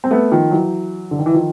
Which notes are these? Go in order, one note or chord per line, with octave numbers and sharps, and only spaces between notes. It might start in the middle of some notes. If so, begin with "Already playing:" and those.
C4
A3 B3
D#3 F3
E3 F#3
D3
D#3
E3
D#3 F3